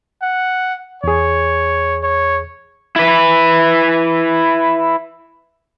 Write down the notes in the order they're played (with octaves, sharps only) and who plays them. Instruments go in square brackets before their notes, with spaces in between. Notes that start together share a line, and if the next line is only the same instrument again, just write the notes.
[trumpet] F#5
[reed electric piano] E2 G#4 [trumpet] C#5
[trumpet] C#5
[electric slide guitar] E4 B4